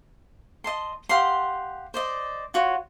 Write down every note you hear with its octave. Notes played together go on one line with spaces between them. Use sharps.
D#5 A5 C6
G4 F5 F#5 C6
C5 D5 D#5
F4 F#4 C#5